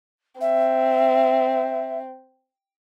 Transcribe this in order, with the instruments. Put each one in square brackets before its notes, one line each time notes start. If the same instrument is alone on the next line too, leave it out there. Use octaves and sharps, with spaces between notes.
[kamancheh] C4 [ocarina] E5